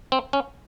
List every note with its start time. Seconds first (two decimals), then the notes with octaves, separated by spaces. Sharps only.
0.12 C4
0.33 C#4